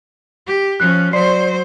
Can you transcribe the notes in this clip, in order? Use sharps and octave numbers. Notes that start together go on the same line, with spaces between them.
G4
F3 C#4 F#6
F#3 C5 D5 C6 C7